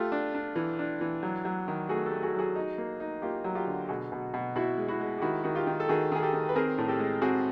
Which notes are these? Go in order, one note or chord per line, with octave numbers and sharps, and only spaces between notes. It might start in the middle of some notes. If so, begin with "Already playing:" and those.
Already playing: A3 F4 G4
D4
D4
E3
D4
E3
F#3
F#3
D#3
A3 F#4 G#4
G4 A4
A3
F#4 G#4
F#3 F#4 G#4
D#4
A#3
D#4
A#3 F4 G4
F#3
F4 G4
D3
B2 F#4 G#4
B2
B2
B2 E4 F#4
G#3
E4 F#4
G#3
G4
D#3 E4 F#4
D#3 F#4
F4 G4
D#3
A4
D#3 F#4 G#4
D#3 G#4
G4 A4
D#3
B4
C4 G#4 A#4
A2
G4 A4
G#3
C4 F#4 G#4